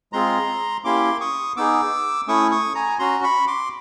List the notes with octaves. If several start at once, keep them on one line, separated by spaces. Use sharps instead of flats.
G#3 C4 F4 G#4 A#5 C6
A#3 C#4 E4 G4 C6 D6
C#6 D#6
B3 D#4 G#4 D6 E6
A3 C#4 E4 C#6 D#6
C#6 D#6
G#5 A#5
C#4 F#4 A#5 C6
B5 C#6
C6 D6